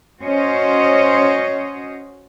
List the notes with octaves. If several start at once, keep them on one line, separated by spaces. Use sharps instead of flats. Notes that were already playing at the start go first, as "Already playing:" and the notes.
C#4 F#4 C5 C#5 D#5